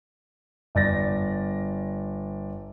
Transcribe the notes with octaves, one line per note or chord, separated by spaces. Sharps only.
G1 D5 A6 A#6